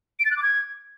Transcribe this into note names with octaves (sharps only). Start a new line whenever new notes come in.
D7
A6
F#6
D6
G#6